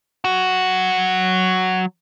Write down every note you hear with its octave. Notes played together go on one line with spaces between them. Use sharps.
F#3 F#4